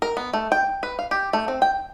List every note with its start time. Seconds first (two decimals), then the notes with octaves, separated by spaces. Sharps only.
0.02 A#4
0.17 B3
0.33 A3
0.52 G5
0.83 B4
0.99 F5
1.11 G4
1.33 A3
1.48 C4
1.62 G5